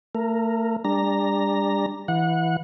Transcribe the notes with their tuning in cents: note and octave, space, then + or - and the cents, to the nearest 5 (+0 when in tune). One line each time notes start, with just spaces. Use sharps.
A3 +35 A#4 +0
G3 +35 D4 +0 A#5 +0
E3 +0 F#5 -25